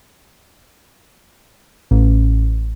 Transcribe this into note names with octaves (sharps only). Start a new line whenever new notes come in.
A1